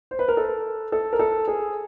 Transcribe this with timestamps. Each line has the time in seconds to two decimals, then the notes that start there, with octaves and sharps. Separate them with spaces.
0.11 C5
0.19 B4
0.28 A#4
0.37 A4
0.92 A4
1.13 A#4
1.19 A4
1.48 G#4